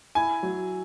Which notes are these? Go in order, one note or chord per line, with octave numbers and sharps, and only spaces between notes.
E4 G#5
F#3